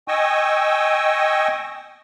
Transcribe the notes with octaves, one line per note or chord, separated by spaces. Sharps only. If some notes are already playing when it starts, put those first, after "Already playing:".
D#5 G5 G#5 C#6 D#6 E6